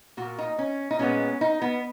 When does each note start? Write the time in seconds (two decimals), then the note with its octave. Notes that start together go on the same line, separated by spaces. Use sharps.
0.17 A#2 A#3 F#4
0.38 D#4
0.58 C#4
0.91 D#4
0.99 A#2 G#3 B3 C#4
1.41 D#4
1.62 B3